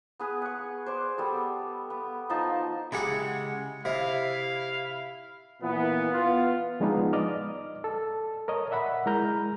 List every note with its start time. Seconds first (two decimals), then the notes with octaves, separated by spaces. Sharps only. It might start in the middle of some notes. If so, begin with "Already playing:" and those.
0.19 B3 G#4 B4
0.42 F#5 C#6
0.86 C5 D5 C#6
1.18 G3 B3 A4
1.90 B3
2.30 F3 D#4 A5
2.92 C#3 G#3 E4 G4 G#4 F#5
3.85 C3 E4 D#5 F5
5.61 A#2 E3 B3
6.12 B3 F4
6.80 F3 G#3 B3 D4 D#4 F4
7.13 D5 D#5 D6 F6
7.84 A4
8.48 A#4 C#5 D#5
8.71 D5 E5 F#5 B5
9.06 G#3 E4 A#4 A#5 F6 G6